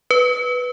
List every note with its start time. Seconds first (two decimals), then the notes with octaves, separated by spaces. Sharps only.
0.11 B4